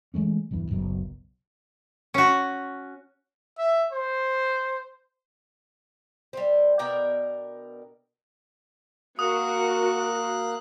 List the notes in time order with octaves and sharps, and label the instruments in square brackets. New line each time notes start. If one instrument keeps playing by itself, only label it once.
[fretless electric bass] E3 G#3 A3 C#4
B1 E2 G2 E3
F#1 B1 B2
[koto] C#4 F#4
[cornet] E5
C5
[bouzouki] G3 C4
B2 D4 A#4 G5
[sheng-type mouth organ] A#3 F#6 [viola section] F#4 A#4 [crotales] D#6